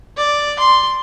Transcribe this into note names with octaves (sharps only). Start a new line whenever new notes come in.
D5
C6